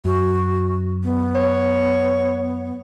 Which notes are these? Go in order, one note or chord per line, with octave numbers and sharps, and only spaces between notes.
F#2 F#4
B3
C#5